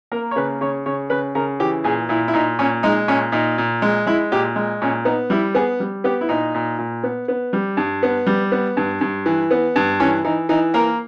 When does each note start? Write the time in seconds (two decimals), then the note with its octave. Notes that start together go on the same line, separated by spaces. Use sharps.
0.12 A#3 A#4
0.31 C#5
0.36 C#3 B4
0.61 C#3 C#5
0.86 C#3 C#5
1.10 C#3 B4
1.35 C#3 A#4
1.60 E3 G4
1.84 A#2 G#4
2.09 A#2 E4
2.28 E4
2.34 A#2 D#4
2.59 A#2 C#4
2.83 G#3 D#4
3.08 A#2 C#4
3.32 A#2 D#4
3.58 A#2
3.82 G#3
4.06 G#3 E4
4.32 A#2 G4
4.56 G#3
4.82 A#2 C#4
5.05 B3 D#4
5.30 G3 E4
5.55 B3 G#4
5.80 G3
6.04 B3 G4
6.21 E4
6.29 A#2 D#4
6.54 A#2
6.78 A#2
7.03 B3
7.28 B3
7.53 G3
7.77 G2
8.03 B3
8.26 G3
8.52 B3
8.77 G2
9.01 G2
9.26 E3
9.51 B3
9.76 G2
10.00 E3 C#4
10.24 E3 D#4
10.49 E3 D#4
10.74 A#3 A#4